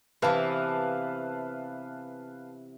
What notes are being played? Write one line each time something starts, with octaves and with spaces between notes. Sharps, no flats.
C3 E3 B3 B4 F5 A5